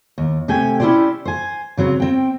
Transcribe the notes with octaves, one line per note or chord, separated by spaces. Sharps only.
D#2
C3 A3 G4 G5 G#5
C#4 E4 F4 G4 C5 D5
C5 G#5
C#3 F#3 C4
C4 G5